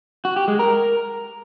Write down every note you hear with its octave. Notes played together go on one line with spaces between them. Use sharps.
F#4
G4
G#3
A#4